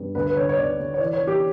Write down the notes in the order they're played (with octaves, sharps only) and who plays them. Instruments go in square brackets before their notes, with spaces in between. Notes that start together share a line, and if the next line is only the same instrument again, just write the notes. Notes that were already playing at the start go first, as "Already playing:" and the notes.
Already playing: [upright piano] G2
D2 B4
B4
D3 C#5
C#5
D2 D5
D2
C#5
E3 D5
C#5
E3
G4